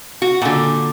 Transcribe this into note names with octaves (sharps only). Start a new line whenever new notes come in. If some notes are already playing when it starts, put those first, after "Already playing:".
F#4
A#2 D3